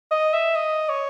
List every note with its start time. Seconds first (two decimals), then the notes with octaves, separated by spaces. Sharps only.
0.11 D#5
0.33 E5
0.55 D#5
0.89 C#5